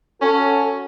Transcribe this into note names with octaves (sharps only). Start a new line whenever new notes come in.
C#4 F#4 A4